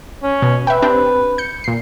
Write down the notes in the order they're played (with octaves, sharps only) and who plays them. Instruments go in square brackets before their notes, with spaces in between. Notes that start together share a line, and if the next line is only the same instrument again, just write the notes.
[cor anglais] C#4
[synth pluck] B2
[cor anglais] B4 [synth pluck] E5 G5
[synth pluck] C4 D4 G4
G6 C#7
A#2 C7